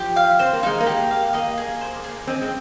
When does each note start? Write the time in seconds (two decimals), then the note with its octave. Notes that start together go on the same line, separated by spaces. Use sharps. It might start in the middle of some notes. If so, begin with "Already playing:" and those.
Already playing: F3 G4
0.16 F5
0.39 C4 C5
0.53 A#3
0.63 G#3 D#4
0.80 A#3
0.86 G4
1.11 F5
1.33 A#3 D#5
1.58 G#4
1.81 C5
2.04 G#4
2.27 C4 D#5
2.41 G#3